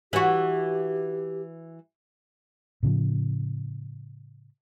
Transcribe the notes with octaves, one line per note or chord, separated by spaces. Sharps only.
E3 F#4 G4
A2 C#3 F3